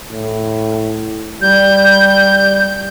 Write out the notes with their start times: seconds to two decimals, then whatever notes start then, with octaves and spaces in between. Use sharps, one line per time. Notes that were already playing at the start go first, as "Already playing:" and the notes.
0.12 A2
1.41 G3 G6